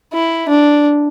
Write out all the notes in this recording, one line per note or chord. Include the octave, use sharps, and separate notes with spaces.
E4
D4